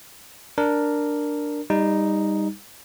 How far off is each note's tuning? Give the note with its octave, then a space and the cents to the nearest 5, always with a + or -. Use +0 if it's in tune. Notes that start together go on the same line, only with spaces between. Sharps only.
D4 +0 A#4 +0
G3 +20 D#4 +0